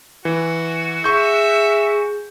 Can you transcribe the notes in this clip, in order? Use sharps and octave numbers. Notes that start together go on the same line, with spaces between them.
E3 F#4
G#4 E5 C#6 G6